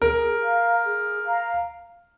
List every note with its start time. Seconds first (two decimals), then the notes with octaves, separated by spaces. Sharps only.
0.02 G#4 A#4
0.42 F5 A#5
0.84 G#4
1.25 F5 A#5